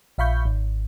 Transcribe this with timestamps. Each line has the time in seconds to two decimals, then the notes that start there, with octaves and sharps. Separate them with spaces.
0.18 A#1 E5 F5 B5 C#6 G6
0.45 G#1